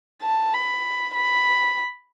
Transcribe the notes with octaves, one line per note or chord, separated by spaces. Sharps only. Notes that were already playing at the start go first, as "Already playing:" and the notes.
A5
B5
B5